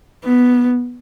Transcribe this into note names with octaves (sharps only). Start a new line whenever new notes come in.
B3